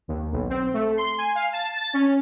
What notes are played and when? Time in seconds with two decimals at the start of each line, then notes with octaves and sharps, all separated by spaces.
0.08 D#2
0.32 B1
0.50 C4
0.74 A3
0.97 C6
1.18 G#5
1.35 F5
1.53 A5
1.75 A6
1.94 C#4